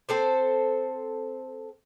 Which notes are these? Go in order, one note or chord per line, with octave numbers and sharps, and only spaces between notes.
C4 A4 C5